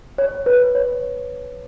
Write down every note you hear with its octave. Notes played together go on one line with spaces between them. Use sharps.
C#5
B4
C#5